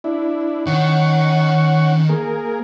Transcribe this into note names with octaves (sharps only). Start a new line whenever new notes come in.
D4 E4
D#3 C#4 F#5 C#6
A#3 G#4 A#4